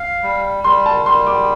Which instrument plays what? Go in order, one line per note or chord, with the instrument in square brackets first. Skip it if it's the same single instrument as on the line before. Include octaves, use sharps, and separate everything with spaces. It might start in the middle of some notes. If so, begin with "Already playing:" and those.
Already playing: [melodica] F5
G3
[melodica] G3 [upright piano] C6
[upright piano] A5
[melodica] G3 [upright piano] C6
[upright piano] D6